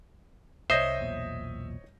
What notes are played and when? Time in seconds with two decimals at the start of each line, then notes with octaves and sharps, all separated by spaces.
0.70 C2 C5 C#5 D#5 E5 D#6 G6 A#6
1.00 B1 E2 A#2